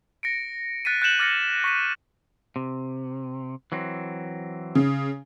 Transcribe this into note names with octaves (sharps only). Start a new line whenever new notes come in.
A#6 C#7 D7
F#6 A6 B6 C#7 D#7
F#6 G6 C#7 E7 F#7
D6 F6 A6 A#6 C#7 D#7
C#6 B6 D#7
C3
E3 F#3 C4
C#3